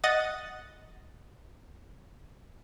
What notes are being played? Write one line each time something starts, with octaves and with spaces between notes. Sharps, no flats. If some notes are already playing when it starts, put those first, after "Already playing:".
D#5 F#5 D#6 A6